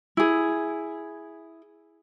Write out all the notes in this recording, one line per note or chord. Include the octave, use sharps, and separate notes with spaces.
E4 G#4